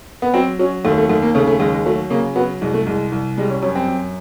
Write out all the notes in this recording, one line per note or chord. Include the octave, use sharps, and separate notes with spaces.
B3
F#3 C4
F#3 C#4
D#2 A3
A3
D#2 A3
A#3
C#3 A3
A3
D#2 G#3
G#3
F#3 A3
C#3 A#3
F#3 B3
C2 G#3
A3
C2 G#3
C2
G3 G#3
C#4
F#2 C#4
C4
F#2